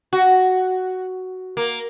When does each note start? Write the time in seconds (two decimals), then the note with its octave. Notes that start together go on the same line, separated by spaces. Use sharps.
0.13 F#4
1.57 A#3